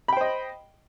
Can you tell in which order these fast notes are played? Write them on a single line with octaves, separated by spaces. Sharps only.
B5 G5 C5 D#5